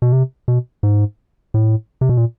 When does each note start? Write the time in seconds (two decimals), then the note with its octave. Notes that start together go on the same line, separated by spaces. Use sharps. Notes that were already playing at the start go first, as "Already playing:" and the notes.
0.02 B2
0.12 C3
0.48 B2
0.83 G#2
1.54 A2
2.01 C3
2.09 B2
2.17 A#2